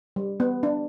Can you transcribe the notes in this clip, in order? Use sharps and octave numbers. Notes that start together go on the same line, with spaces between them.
G3
B3
D4